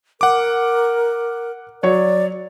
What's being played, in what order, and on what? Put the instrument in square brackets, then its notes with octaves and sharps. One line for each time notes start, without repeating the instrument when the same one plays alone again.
[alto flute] A#4 [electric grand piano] F#5 D6
[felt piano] F#3 C#5 [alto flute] D5